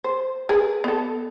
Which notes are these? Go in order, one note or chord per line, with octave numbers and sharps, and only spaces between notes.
C5
G#4 A#4 B4
B3 A4